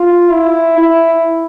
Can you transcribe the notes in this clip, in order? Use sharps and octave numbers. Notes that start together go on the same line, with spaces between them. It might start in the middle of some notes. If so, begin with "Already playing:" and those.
Already playing: F4
E4
E4